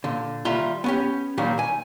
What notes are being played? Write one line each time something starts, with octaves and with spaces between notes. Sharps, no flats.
A#2 D3
D#2 G3 F4 E5 A#5 C6
B3 C#4 G4
A#2 D#3 F#3 G3
G#5